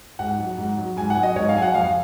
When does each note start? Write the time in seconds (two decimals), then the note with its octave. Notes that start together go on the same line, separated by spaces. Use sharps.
0.19 G#2 F#5
0.39 F#3
0.58 G#2
0.78 F#3
0.97 G#2 G#5
1.10 F#5
1.16 F#3
1.23 D#5
1.36 G#2 C#5
1.49 F5
1.56 F#3 G#5
1.62 F#5
1.74 F2 F5